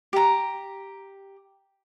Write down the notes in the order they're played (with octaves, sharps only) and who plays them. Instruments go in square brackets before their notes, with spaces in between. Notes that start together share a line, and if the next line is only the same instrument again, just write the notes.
[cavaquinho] G4 A#5